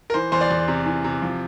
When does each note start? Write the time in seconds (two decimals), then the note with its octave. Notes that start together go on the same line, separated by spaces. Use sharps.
0.10 A#4
0.14 E3 C5
0.32 E2 C5
0.41 D5
0.50 E2
0.68 C3
0.86 E3
1.04 C3
1.22 F3